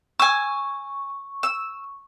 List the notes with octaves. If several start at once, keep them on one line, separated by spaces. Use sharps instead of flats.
G#5 C#6 E6
E6